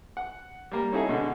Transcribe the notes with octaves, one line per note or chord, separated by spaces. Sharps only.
F#5
G3 A#3
C#4 D#4 E4 F#4 G#4 A4
B2 D3 G#3